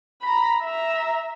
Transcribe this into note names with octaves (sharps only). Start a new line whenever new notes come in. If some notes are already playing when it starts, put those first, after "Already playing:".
A#5 B5
E5 A#5